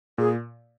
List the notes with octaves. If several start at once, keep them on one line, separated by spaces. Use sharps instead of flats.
A#2 G#4